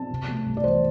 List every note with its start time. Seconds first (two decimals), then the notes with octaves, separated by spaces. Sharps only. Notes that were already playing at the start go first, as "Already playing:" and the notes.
Already playing: C4 A5
0.10 C3
0.28 A3
0.46 C2
0.57 D5
0.64 E3 C5